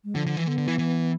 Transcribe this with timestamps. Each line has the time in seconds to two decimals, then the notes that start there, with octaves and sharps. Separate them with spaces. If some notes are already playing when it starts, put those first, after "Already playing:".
0.04 G#3
0.15 D3 F3
0.26 D3
0.37 E3
0.47 D3 B3
0.58 D3
0.68 E3
0.79 E3